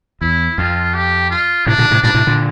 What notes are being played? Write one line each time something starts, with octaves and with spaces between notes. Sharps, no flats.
E2 E4
F2 F4
G4
F4
A2 C3 D4
A#2 D3
A2 C3
G2 A#2 D4
A2 C3
A#2 D3